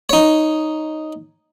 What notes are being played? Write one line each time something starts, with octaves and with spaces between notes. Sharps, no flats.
D#4 C#5